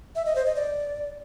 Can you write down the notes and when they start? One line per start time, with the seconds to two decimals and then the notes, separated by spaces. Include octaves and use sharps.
0.15 E5
0.25 D#5
0.35 C5
0.46 D#5
0.56 D5